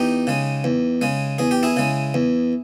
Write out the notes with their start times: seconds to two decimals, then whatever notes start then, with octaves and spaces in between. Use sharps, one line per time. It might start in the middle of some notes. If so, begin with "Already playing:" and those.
Already playing: E2 D#4 G4
0.27 C#3 G#3
0.64 E2
1.02 C#3 G#3
1.38 E2 G#4
1.51 G4
1.63 E4 G#4
1.77 C#3 G#3
2.14 E2